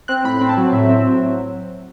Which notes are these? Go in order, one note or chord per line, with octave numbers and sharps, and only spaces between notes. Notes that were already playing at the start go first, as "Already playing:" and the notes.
C4 F#6
A2 B5
B5
C4
A5
F#3
A2 E5
C4
F#3